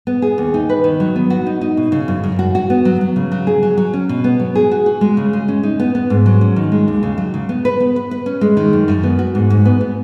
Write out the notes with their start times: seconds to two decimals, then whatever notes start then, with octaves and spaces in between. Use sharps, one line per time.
0.07 B3
0.22 G#4
0.38 D#2
0.54 D#4
0.69 B4
0.84 D#3
1.00 F#3
1.16 B3
1.30 F#4
1.46 D#4
1.61 D#4
1.77 B2
1.92 C#3
2.08 F#2
2.24 F#2
2.39 F#4
2.55 F#4
2.70 B3
2.85 F#3
3.01 F#3
3.16 C#3
3.32 F#3
3.47 G#4
3.63 F#3
3.77 F#3
3.93 C#4
4.09 B2
4.24 B3
4.40 F#3
4.55 G#4
4.71 F#4
4.86 F#4
5.01 G#3
5.17 C#3
5.33 G#3
5.48 C#4
5.63 D#4
5.79 B3
5.95 B3
6.10 G#2
6.26 F#3
6.41 C#4
6.56 D#3
6.72 G#3
6.88 D#2
7.03 C#3
7.18 F#3
7.34 C#3
7.49 B3
7.65 B4
7.80 B3
7.96 B4
8.11 B4
8.26 C#4
8.41 G#3
8.57 D#3
8.73 F#2
8.88 F#2
9.03 B3
9.19 F#4
9.35 G#2
9.50 G#2
9.65 B3
9.81 B3